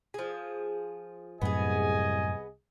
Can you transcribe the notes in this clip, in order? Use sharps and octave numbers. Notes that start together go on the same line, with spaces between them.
F3 G#4
C2 F#2 A2 B3 G#4 D#5 G#5